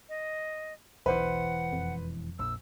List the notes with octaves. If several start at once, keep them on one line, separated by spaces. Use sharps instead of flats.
D#5
E1 B1 E3 B4 C5 F#5
F2
A#1 E6